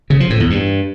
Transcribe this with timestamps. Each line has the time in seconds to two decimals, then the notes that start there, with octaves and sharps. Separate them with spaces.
0.10 C#3
0.20 F3
0.30 A2
0.40 E2
0.50 G2